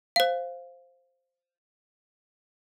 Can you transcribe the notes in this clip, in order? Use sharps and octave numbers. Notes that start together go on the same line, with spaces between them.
C5 F5